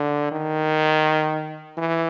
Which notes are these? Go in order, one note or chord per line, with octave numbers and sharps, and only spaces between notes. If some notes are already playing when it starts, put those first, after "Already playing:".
Already playing: D3
D#3
E3